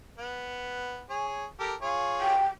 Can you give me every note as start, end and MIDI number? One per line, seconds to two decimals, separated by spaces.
0.18 1.03 59
1.10 1.45 68
1.10 1.45 73
1.60 1.75 67
1.60 1.75 69
1.60 1.75 70
1.82 2.39 65
1.82 2.39 68
1.82 2.39 73
2.21 2.46 79